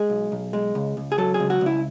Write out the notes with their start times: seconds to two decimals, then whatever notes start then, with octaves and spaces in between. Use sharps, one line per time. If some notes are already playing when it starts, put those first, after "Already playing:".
Already playing: G#3 G#4
0.10 B1
0.32 B1
0.53 G#3
0.75 C#2
0.97 C#2
1.12 G#4
1.18 F#3 A4
1.34 G#4
1.40 C#2
1.50 F#4
1.61 C#2 E4